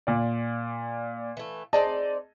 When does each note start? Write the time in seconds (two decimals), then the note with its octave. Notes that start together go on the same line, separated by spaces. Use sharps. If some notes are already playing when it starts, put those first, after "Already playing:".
0.07 A#2 D5
1.37 E3 A3
1.73 C4 D#4 G#4 D5 D#5 A5